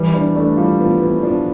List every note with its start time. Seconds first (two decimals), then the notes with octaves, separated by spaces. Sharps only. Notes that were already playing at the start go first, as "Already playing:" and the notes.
Already playing: E3 G3
0.14 B3 D4
0.36 A3 D4
0.57 G3 F4
0.79 F3 B3
1.01 E3 B3
1.23 F3 D4